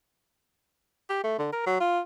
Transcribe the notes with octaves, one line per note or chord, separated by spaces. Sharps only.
G4
A3
D3
A#4
F#3
F4